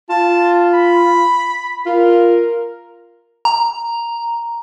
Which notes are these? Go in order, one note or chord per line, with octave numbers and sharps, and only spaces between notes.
F4 A5
B5
F4 A#4
A#5